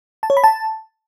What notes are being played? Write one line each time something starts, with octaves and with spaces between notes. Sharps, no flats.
A5
C#5
B5
A5